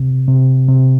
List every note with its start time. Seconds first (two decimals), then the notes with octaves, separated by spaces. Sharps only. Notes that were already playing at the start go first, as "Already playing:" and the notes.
Already playing: C3
0.28 C3
0.68 C3